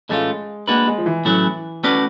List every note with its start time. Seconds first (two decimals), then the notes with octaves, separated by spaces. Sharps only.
0.09 A2 E3 G#3 A3 C#4 F4
0.68 G#3 A#3 D4 F#4 B4
0.87 G#3
0.98 F3
1.06 E3
1.25 A2 E3 F#3 A3 C#4 E4
1.84 A3 C#4 F#4 B4 D5